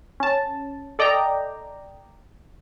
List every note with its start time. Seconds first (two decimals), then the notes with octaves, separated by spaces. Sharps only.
0.20 C#4 A5
0.99 A4 D5 D#5 G5 A#5